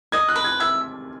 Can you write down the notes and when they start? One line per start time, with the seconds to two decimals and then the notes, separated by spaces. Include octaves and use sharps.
0.12 D#5 G#6
0.28 F#6
0.36 B4
0.44 G#6
0.60 E5 G#6